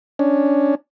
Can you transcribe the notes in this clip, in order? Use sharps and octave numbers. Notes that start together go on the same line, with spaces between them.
C#4 D4